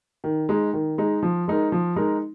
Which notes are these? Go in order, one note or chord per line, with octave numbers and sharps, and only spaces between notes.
D#3
G#3 D#4
D#3
G#3 D#4
F3
G#3 D#4 A#4
F3
G#3 D#4 A#4